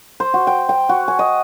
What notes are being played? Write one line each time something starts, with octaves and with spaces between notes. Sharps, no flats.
C5
F#4
G5
G5
F#4
G#5
D#5